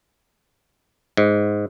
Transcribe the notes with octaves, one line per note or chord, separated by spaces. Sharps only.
G#2